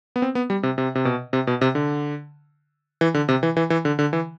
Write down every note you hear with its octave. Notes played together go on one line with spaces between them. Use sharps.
B3
C4
B3
G3
C3
C3
C3
B2
C3
B2
C3
D3
E3
D3
C3
E3
E3
E3
D3
D3
E3